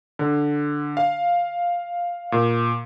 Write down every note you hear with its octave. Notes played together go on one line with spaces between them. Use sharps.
D3
F5
A#2